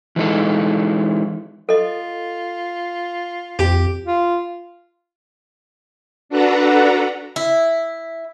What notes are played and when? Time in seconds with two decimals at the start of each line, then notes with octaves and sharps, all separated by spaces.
0.16 E3 G#3 D#4 A4
1.69 F4 A4 D#5
3.59 F2 G4
4.06 F4
6.29 D4 F#4 A4 B4 F#5 A#5
7.36 E4